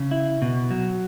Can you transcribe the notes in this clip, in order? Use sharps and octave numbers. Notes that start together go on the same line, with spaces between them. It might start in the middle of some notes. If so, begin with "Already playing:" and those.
Already playing: C#3
E4
B2
F#3